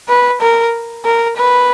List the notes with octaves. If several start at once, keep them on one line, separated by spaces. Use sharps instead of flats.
B4
A#4
A#4
B4